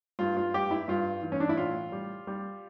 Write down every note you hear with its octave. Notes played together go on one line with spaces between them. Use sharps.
G2 F4
F4
G2 G4
E4
G2 F4
E3
C#4
D4
E4
A2 F4
G3
G3